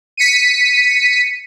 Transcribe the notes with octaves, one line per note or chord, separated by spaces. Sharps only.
B6 C#7 D#7